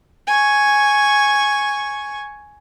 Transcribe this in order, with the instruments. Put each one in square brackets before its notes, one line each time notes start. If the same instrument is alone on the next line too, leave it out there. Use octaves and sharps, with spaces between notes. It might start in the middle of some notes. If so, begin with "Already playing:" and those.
[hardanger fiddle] G#5 C#6